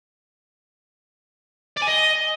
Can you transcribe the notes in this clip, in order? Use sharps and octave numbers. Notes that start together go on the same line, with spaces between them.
D5
G#5
D#5